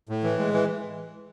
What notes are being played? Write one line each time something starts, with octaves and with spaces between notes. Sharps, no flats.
A2
E3
G#3
E3